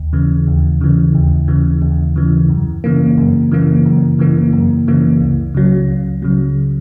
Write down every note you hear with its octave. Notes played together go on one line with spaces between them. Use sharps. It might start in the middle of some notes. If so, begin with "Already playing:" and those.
Already playing: D#2
C#3 E3
D#2
C#3 E3
D#2
C#3 E3
D#2
C#3 E3
F#2
C#3 E3 A#3
F#2
C#3 E3 A#3
F#2
C#3 E3 A#3
F#2
C#3 E3 A#3
C#2
C#3 F#3
C#2
C#3 F#3